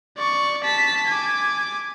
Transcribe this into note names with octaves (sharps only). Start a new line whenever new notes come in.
D5 C#6
A5 B6
G#5 D6